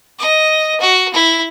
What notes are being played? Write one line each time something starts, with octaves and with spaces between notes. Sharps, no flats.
D#5
F#4
E4